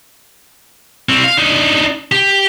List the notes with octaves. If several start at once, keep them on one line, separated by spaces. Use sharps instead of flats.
G3 C4
F5
D4 D#4
G4